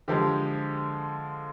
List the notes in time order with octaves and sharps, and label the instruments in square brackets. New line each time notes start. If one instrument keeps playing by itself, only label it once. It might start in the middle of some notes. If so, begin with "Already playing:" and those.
[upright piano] D3 F3 G#3 G4